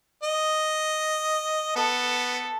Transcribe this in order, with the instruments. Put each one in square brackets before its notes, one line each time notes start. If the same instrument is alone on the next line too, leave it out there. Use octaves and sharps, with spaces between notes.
[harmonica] D#5
[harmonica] B3 [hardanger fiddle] A4